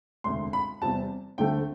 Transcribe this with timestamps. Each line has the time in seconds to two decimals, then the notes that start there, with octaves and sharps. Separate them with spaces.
0.24 E1 D2 C3 C6
0.53 B5
0.81 E2 C3 G3 C4 A5
1.38 D2 D3 A3 C4 G5